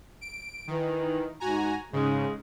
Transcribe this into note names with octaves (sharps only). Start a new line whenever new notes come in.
D7
D#3 E3
G#2 F#4 G#5 A#5
G#2 C#3 G#3